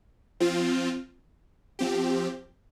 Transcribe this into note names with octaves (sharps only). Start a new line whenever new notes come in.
F3 C4 F4
F3 C4 G4